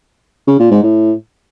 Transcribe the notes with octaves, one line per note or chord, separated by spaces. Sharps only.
C#3
A#2
G#2
A2